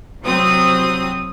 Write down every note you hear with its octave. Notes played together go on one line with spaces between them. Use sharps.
C2 F#3 C4 D#6